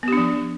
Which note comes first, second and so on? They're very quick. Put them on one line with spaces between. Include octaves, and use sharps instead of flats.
B3 G4 D4 F3